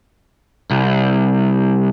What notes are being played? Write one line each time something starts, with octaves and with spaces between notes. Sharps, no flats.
C2